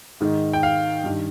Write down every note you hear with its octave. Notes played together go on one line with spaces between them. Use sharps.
G#2 D#3
G5
F5
G2 D#3